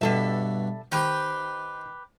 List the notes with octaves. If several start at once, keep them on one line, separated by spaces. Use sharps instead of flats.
G2 B2 G3 A4 E5
D#3 G4 B4 C5 G5 C6